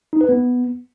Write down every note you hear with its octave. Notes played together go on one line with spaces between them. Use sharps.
D#4
B4
B3